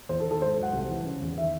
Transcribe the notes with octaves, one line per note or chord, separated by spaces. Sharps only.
E2 C5
A4
D#3
A4
G#2 C5
F#3
F#5
C2
E3
C#3
E2
D#3 E5